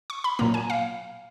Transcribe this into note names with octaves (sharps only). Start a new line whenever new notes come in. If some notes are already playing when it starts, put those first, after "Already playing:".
C#6
B5
A#2 F#3 A#3 A#5
G#5
F5